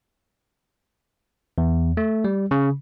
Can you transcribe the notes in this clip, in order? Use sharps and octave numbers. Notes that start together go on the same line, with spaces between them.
E2
A3
G3
C#3